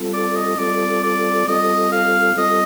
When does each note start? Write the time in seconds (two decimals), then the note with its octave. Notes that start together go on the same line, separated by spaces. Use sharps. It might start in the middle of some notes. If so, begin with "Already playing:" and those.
Already playing: G3 C4 F4 A4
0.13 D5
0.36 D#5
0.58 G3 C4 F4 A4 D5
1.03 D5
1.48 G3 C4 F4 A4 D#5
1.92 F5
2.36 G3 C4 F4 A4 D#5